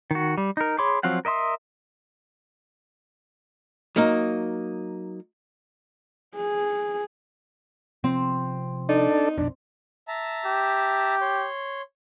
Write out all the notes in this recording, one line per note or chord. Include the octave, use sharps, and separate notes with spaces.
D#3 F#4
G3
D#4 A#4
G#4 C#5 B5 C6 D6
F3 F#3 C4 F5 F#5
A#4 D#5 E5 C6 D#6
F#3 A#3 D#4
G#4
C3 F3 C4
D4 D#4 A4 D5
A#1 F2 B2 D4
E5 A5 A#5
G4
C#5 C6